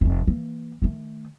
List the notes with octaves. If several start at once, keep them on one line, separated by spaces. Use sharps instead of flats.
F1 F2
E3 A#3
D#3 A3